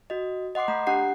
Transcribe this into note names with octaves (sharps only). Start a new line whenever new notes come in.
F#4 D#5
D#5 F#5 C6 D6 C7
A3 A#5 B5
D4 G4 F#5 C7